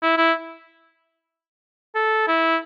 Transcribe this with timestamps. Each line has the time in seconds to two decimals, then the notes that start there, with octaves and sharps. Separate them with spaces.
0.02 E4
0.17 E4
1.95 A4
2.28 E4